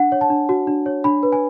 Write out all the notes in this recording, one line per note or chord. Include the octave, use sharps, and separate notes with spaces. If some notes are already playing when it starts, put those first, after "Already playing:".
Already playing: D4 F#5
C#5
A5
D4
F#4
D4
C#5
D4 B5
B4
G#5